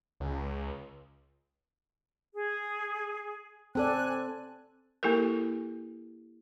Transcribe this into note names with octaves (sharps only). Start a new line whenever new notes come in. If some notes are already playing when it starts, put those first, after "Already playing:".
C#2
G#4
C4 A4 D5 G#5 F#6
A#3 E4 G4 A4 A#4